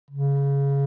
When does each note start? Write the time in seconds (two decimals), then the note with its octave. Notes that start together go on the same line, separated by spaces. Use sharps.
0.11 C#3